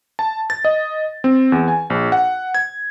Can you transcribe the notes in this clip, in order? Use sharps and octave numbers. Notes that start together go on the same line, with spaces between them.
A5
A6
D#5
C4
E2
G#5
A#1
F#5
G#6